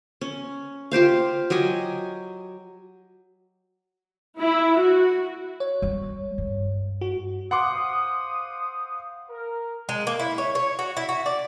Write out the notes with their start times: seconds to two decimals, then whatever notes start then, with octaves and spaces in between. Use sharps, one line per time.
0.21 C#4
0.92 F4 G4 C5 F5
1.50 F#3 G4 D#5 G#5
4.40 E4
4.80 F#4
5.60 C#5
5.82 G3
6.38 G2
7.01 F#4
7.51 C5 F5 F#5 C6 D6 D#6
9.29 A#4
9.89 G#3
10.07 A#3
10.19 E4
10.38 C#5
10.55 C#5
10.79 F#4
10.97 E4
11.09 F#4
11.26 D5